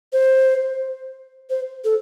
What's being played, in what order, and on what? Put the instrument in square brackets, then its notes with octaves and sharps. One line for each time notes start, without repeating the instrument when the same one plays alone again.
[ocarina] C5
C5
A4